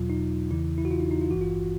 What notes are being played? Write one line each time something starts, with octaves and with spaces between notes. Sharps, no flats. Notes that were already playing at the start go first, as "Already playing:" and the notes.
Already playing: E2 B2 F#3 F4
D#4
E2 C#3 E3 E4
E4
F#4
F4
D#4
D#4
F4
G#1 G2 E3 F#4
F4